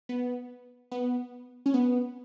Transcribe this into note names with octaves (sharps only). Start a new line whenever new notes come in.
B3
B3
C#4
B3